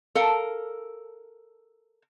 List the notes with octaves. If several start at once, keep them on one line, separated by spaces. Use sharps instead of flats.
A4 A#4 F5